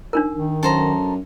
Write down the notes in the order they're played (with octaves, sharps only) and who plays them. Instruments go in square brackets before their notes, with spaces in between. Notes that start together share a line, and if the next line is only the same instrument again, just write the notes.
[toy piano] D4 D#4 A#4
[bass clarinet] D#3
[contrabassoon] F#2 [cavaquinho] A4 C5 A#5